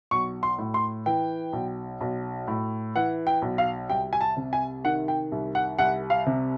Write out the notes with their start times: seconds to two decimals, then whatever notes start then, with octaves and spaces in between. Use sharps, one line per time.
0.11 B1 C#6
0.43 C6
0.58 A2
0.74 C6
1.06 E3 G5
1.53 B1
2.01 B1
2.48 A2
2.95 E3 F#5
3.27 G5
3.42 B1
3.58 F5
3.90 C2 G5
4.13 G#5
4.21 A5
4.37 C3
4.53 G#5
4.84 D#3 F#5
5.08 G5
5.32 C2
5.55 F#5
5.78 C2 F#5
6.10 F5
6.26 C3